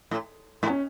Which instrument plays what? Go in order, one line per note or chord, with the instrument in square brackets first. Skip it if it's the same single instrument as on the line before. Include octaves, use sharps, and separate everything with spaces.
[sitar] A2
G#2
[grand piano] C#4